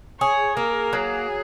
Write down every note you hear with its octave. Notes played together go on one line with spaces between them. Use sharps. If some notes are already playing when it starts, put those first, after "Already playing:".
G#4 C#5
A#3 A#4
F#3 G#4